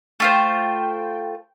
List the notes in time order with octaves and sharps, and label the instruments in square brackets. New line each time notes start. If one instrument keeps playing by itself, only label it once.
[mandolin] A3 F4 C5 [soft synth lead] G5